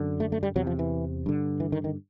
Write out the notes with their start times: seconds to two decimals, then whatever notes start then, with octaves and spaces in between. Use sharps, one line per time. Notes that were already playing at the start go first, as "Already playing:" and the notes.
Already playing: F#2 D3
0.20 A3
0.32 A3
0.43 G3
0.56 E2 C3 F#3
0.67 F3
0.79 E3
1.26 G2 D3
1.60 E3
1.72 D#3
1.84 D#3